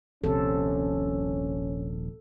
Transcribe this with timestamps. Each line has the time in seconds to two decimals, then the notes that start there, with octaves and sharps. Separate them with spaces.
0.24 D#1 A#1 C3 C#4 A4